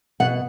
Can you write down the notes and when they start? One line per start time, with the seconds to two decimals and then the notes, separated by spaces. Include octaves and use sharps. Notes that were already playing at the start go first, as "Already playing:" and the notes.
0.20 B2 F#5